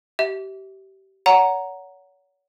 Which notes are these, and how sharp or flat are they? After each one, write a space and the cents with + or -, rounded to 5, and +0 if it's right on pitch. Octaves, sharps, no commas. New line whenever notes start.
G4 -30 E5 -25
C#5 +35 F#5 +0 A#5 +0